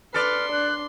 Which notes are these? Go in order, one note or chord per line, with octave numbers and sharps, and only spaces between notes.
A4 B4 D5 C6 F6
D4 F#6